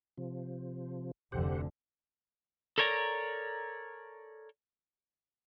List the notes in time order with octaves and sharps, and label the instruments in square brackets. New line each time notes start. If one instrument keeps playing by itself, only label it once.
[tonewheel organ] C3 F3
[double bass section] F1 D2 D3 [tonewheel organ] G4 C5 F#5
[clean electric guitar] A4 A#4 C#5 D5 G#5 A#5